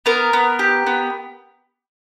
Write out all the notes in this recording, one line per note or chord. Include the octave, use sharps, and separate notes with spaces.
B3 A#4
B3
G4
B3